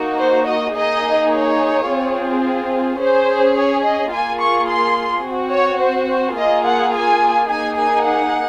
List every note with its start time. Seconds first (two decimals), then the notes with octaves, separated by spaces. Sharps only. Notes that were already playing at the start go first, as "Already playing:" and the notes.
Already playing: A#3 D#4 F#4
0.18 C5
0.47 D#5
0.75 A#3 D#4 G#4 D#5
1.31 C#5
1.87 C4 F4 G#4
2.99 C#4 G#4 C5
3.56 C#5
3.84 D#5
4.12 A#3 F4 G#4 G#5
4.40 C#6
4.68 C6
5.24 C4 F#4
5.52 C#5
5.80 C5
6.09 C5
6.37 A#3 F4 G#4 D#5
6.64 F#5
6.93 G#5
7.49 A#3 D#4 G#4 G#5
7.77 G#5
8.05 F#5